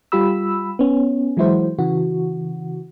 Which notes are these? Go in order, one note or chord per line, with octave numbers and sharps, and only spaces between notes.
G3 F4 G4 B5 E6
B3 C#4
E3 F#3 G#3 E4 F#4 C5
C#3 E3 F#4